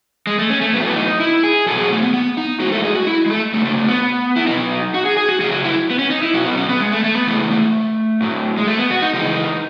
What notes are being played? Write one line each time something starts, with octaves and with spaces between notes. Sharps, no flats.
G#3
A3
C#4
A3
A2 F#3 A3 B3
B3
D#4
E4
G#4
B2 F#3 A4
G#4
A3
B3
B3
D#4
A2 G#3 F#4
A4
G#4
F#4
E4
G#3
A3
C#3 F#3 A3
A3
A3
B3
E4
B2 F#3 D#4
F#4
G#4
G#4
F#4
C#3 F#3 G#4
F#4
E4
B3
C#4
D#4
E4
B2 F#3 F#4
B3
C#4
B3
G#3
A3
A3
B3
C#3 E3 G#3 A3
A3
A2 F#3
G#3
A3
B3
F#4
D#4
C#3 E3 G#3 D#4